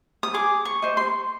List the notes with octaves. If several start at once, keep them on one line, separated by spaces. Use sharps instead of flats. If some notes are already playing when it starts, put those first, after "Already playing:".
D#6
G#4 D6
C#6
C5 D#5
C6